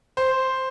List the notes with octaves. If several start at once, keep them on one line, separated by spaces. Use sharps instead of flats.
C5